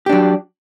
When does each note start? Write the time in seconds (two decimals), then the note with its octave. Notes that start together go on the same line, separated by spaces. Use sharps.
0.06 G4
0.09 D4
0.12 F#3